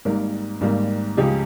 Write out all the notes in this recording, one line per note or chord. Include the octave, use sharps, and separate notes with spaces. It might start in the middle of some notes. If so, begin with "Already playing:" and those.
G#1 G#2 G3 A#3 A#4
G#1 G#2 G3 A#3
C#2 C#3 F3 G#3 G4